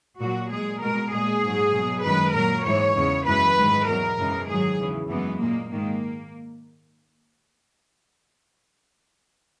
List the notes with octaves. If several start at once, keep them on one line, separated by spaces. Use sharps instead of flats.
A#2 F#3 F#4
A#2 G#3 G#4
B2 G#3 A#4
A#2 G#3 G#4
G#2 F#3
B2 F#3
F#2 D#3 G#3 B4
A#2 F#3 A#4
G#2 E3 G#3 C#5
E2 C#3 G#3
F#2 E3 G#3 B4
G#2 D#3 G#3
E2 B2 F#3 A#4
F#2 C#3 E3 G#3
G#2 D#3 F#3 G#4
E2 C#3 E3
F#2 E3 G#3 B3
A#2 G#3 A#3
G#2 D#3 G#3 A#3